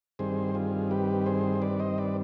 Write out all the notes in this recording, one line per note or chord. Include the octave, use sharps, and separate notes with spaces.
G2 D#3 G3 C4 G#4 C5
F4 G#4
G4 B4
G#4 C5
B4 D5
C5 D#5
B4 D5